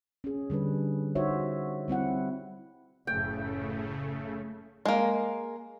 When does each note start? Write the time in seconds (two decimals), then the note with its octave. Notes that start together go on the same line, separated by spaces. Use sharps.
0.24 C#4 G#4
0.50 D3 G3 D4 B4
1.15 D#4 F4 F#4 C5 C#5 E5
1.88 G3 C4 E4 F#5
3.07 F#1 A2 C#3 A3 G5
4.86 G#3 A#3